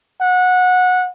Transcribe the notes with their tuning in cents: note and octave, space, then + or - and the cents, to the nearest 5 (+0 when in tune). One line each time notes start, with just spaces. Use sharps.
F#5 -20